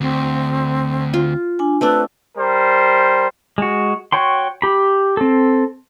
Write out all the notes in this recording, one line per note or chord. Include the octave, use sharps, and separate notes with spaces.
D2 C4
F4
D4 G#5
A3 C4 D4 B4 A5 E6
G3 A#4 C5
G#3 F#4
F#4 C#5 G5 C6
G4 B5
C4 A4